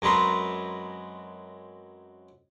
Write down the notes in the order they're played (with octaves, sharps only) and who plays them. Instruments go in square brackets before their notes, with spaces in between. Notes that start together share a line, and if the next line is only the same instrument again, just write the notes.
[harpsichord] F#2 G#3 C4 B4 A#5 C6